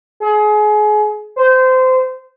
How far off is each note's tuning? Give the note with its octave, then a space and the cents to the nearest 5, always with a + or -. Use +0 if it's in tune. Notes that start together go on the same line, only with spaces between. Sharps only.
G#4 +30
C5 -20